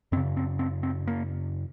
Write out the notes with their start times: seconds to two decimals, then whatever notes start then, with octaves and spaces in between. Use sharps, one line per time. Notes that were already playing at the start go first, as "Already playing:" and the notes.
0.12 F#2 C4
0.17 C#3
0.37 C4
0.59 C4
0.83 C4
1.07 A#3